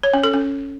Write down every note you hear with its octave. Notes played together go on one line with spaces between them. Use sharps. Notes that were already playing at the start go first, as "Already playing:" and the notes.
C#5
C#4
A4
C#4